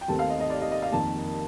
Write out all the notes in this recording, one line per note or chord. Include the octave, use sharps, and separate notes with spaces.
G5
D#2 D#3 A3 C4 A5
F5
D#5
D#5
D5
D#5
D#5
F5
F2 D#3 A#3 A5